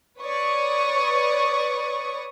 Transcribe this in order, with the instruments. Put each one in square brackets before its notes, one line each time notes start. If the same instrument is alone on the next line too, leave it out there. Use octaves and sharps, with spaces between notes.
[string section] B4 C#5 D5 C#6 D#6